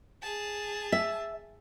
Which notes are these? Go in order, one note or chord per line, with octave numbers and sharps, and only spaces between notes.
G#4 A5
E5